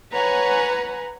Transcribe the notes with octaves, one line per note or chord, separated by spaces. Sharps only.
B4 C#5 F#5 G#5 A#5